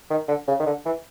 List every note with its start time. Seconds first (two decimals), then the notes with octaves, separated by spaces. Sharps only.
0.10 D#3
0.28 D3
0.48 C#3
0.60 D#3
0.66 D3
0.86 E3